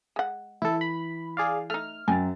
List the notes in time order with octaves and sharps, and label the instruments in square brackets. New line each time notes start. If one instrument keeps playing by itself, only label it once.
[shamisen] G#3 F#5
[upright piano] E3 [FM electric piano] E4 A4
[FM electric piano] B5
G#4 D5 F5
[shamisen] A3 D#4 [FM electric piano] F6
[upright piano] F#2 A6 [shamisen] G5 G#5